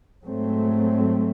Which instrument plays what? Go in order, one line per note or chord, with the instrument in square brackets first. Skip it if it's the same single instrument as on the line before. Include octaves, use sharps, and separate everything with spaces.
[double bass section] G#2 F#3 A3 C4